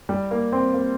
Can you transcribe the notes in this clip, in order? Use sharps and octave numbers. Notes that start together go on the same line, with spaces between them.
G3
A#3
C4
A#3